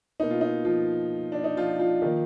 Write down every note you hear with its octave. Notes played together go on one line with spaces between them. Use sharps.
B2 A#3 D#4
F4
D#4
F3 F4
D4
D#4
F3 F4
F3 F4
D#3 A#3